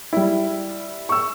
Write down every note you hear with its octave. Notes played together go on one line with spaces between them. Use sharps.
G3 E4
C#6 E6